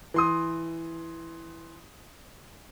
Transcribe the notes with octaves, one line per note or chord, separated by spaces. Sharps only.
E3 C6 D#6